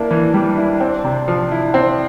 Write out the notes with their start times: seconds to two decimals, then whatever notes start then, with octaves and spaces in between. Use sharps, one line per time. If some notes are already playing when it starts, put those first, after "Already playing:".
Already playing: A#3 D4 E4
0.11 E3
0.34 G3
0.58 E4
0.80 C4
1.04 C3
1.28 F3
1.52 E4
1.74 C4